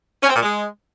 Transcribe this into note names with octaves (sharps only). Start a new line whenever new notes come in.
C#4
C4
A#2
G#3